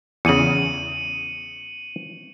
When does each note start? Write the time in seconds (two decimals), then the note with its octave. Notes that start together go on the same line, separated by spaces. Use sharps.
0.25 E2 C#3 C#7 D#7 F#7